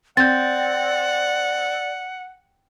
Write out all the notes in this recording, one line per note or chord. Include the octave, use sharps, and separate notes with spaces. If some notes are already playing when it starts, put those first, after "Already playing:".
C4 D5 F#5 G6 A6